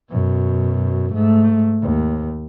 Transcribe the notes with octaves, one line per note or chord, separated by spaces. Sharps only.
F#2 B2
G#2 A3
D#2